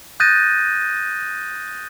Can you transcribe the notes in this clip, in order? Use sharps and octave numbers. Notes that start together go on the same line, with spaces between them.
D#6 F#6 G6 A6 A#6 D#7